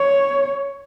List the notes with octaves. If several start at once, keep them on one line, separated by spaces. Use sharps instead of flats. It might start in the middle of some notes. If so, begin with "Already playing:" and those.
Already playing: C#5